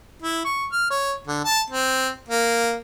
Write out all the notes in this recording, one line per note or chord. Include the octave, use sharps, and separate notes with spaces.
E4
C#6
F6
C#5
D3
A5
C4
A#3